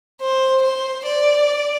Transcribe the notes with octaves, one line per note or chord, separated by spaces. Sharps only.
C5
C5
D5